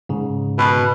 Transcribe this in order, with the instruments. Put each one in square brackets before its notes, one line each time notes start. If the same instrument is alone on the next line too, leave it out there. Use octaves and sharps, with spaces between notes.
[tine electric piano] G#2 C#3
[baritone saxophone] B2